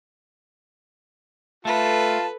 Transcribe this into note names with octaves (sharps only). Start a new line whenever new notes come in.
A3 F4 A4 B4 A5